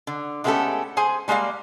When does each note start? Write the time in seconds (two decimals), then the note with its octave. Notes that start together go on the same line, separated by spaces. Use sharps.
0.07 D3
0.44 G#3 A3 B3 C#4 G4 A4
0.97 G#4 C5 G#5
1.28 G3 G#3 A#3 D5 F5